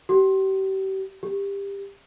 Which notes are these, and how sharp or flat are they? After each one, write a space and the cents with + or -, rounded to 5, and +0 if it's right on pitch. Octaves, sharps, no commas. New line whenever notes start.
G4 -35
G4 +20